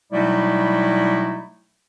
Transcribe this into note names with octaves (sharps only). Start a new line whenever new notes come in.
B2 F#3 G3 A3 D#4 E4